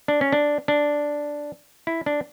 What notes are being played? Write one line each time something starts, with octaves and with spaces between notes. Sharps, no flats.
D4
C#4
D4
D4
E4
D4